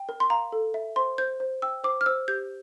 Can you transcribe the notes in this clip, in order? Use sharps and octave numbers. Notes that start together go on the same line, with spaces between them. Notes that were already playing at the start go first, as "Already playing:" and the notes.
Already playing: G5
A#4
C6
F5 A#5
A4
E5
C5 C6
C5 G6
C5
G5 E6
C5 D6
F6
C5 E6
G4 G6